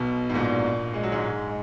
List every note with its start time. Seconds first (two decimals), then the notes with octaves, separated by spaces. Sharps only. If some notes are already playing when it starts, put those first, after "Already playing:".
Already playing: B1 B2
0.30 G#2
0.34 A#1 A#2
0.94 G#3
1.03 F#3
1.12 G#2 G#3
1.47 G#3